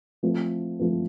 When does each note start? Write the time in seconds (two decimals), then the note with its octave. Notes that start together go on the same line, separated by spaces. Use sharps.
0.23 F3 A3 C4
0.79 F3 A3 C4